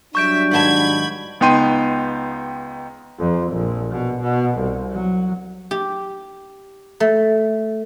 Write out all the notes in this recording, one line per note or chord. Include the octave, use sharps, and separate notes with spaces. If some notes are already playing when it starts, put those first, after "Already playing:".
F#3 G3 D4 E5 C#6 G6 D7
G#2 D#3 A5 B5 G#6
C#2 B3 D#4 G5 C6 D#7
F2
A#1
B2
B2
C2
F#3
G4
A3